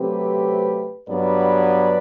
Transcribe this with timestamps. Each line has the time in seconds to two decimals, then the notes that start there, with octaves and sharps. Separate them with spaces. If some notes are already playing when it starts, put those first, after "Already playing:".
Already playing: C3 F#3 A3 C4 G4 B4
1.08 G2 F#3 B3 B4 D5